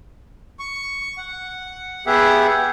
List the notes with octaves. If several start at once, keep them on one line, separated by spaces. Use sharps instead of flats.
C#6
F#5
B3 G4 G#4 E5 F#5